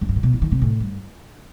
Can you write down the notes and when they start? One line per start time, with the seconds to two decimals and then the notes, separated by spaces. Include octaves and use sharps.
0.01 F#2
0.09 G2
0.16 A2
0.23 B2
0.33 E3
0.42 D#3
0.52 C3
0.62 A2
0.80 G2